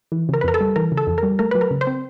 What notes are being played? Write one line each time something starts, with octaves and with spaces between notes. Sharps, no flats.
E3
C#3 A#4
B4
F2 A#4
A4
G3
E3 A#4
C#3
A4
F2
A#4
G3
A3 A#4
F#3 B4
A#4
C#3
C5
C4